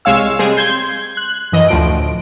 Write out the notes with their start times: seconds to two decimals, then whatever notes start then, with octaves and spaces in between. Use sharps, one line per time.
0.05 C2 G#3 C#5 F5 E6
0.39 G3 G#3 C4 G#4
0.57 C6 G6 G#6
1.17 F#6
1.52 F#2 E3 D#5
1.69 D2 A2 F3 D7